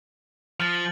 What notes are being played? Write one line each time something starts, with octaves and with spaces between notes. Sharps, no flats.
F3 F6 A6
F#7